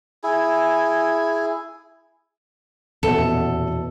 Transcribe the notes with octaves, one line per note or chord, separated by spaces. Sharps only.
E4 G#4
D#1 E2 B2 B3 A4